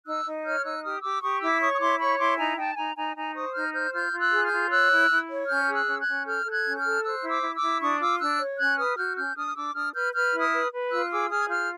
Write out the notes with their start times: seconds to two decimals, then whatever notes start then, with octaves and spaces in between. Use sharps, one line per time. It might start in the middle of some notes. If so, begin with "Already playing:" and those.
0.05 D#4 E6 F#6
0.25 D#4
0.44 C#5 F6 G6
0.64 D#4 E6 F#6
0.82 G4 D#6 F6
1.02 G4 D6 E6
1.22 G4 C#6 D#6
1.41 E4 D6 E6
1.60 C#5 C#6 D#6
1.74 D#6
1.80 E4 C6 D6
1.99 C#5 B5 C#6
2.18 E4 C6 D6
2.38 D#4 G#5 A#5
2.57 D#4 G5 A5
2.77 D#4 G#5 A#5
2.96 D#4 G#5 A#5
3.16 D#4 G#5 A#5
3.34 C5 C#6 D#6
3.54 D#4 F6 G6
3.73 C5 F6 G6
3.93 F4 F6 G6
4.12 F4
4.19 E6 F#6
4.32 G#4
4.44 F6 G6
4.51 F4
4.70 C#5 E6 F#6
4.90 E4
5.09 E4
5.28 C#5
5.48 C#4 F6 G6
5.68 G#4
5.73 E6 F#6
5.87 C#4
5.99 F#6 G#6
6.06 C#4
6.25 A4 F6 G6
6.45 A4 G6
6.52 F#6 G#6
6.65 C#4
6.77 F6 G6
6.84 A4
7.03 C5 E6 F#6
7.23 E4
7.29 D6 E6
7.42 E4
7.55 D6 E6
7.61 E4
7.80 D4 C#6 D#6
7.99 F4 D6 E6
8.19 D4 E6 F#6
8.39 C#5
8.58 C#4 F#6 G#6
8.77 B4 D#6 F6
8.97 F#4 F6 G6
9.16 C#4 F6 G6
9.35 D4 D#6 F6
9.46 F6
9.55 D4 D6 E6
9.74 D4 D#6 F6
9.94 B4 F6 G6
10.13 B4 F6 G6
10.32 E4
10.38 D#6 F6
10.52 B4
10.71 B4
10.90 F4 E6 F#6
11.10 G#4 D6 E6
11.29 G#4 D#6 F6
11.39 G#6
11.49 F4 F6 G6